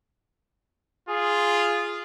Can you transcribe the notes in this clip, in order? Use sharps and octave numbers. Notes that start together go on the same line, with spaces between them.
F4 G#4